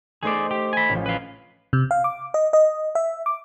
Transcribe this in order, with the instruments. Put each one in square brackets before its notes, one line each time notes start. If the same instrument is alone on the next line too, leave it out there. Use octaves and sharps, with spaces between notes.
[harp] A3 D#4 C5 [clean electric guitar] G#4 D5
[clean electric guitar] G4
G#5 B5
[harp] A1 F3
[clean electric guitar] B4 F5
[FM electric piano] C3
F5
D6
D#5
D#5
E5
D6